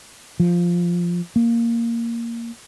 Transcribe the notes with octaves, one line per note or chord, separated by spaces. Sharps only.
F3
A#3